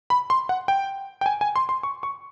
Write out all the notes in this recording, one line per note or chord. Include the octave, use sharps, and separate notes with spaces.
B5
C6
F#5
G5
G5
G#5
G#5
C6
C6
C#6
C#6